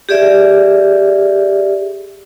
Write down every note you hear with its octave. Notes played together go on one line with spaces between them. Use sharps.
G4 G#4 D5 E5